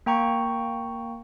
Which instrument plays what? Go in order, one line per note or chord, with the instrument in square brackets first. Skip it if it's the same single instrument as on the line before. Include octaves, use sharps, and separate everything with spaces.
[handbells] A#3 G5 A#5 C#6